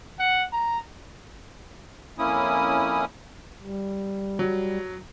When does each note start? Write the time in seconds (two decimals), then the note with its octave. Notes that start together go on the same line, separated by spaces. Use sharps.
0.19 F#5
0.53 A#5
2.19 F2 A#3 C#4 E4 D#6
3.62 G3
4.39 F#3